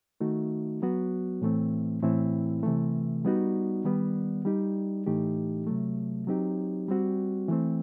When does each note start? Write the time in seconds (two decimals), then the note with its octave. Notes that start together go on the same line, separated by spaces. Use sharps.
0.21 D#3 A3 D#4 F#4
0.82 F#3 B3 F#4
1.42 A2 E3 A3 C4
2.03 A2 E3 A3 C4 E4
2.63 C3 E3 A3
3.25 G3 B3 D#4 F#4
3.84 D#3 G3 B3
4.45 G3 D#4 G4
5.06 A2 E3 A3 D#4 G4
5.67 C3 F#3 A3
6.27 F#3 C4 D#4 G4
6.88 G3 C4 F#4
7.48 E3 A3 C4